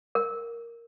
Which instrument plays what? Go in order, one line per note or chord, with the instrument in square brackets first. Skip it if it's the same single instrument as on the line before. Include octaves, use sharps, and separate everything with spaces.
[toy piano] A#4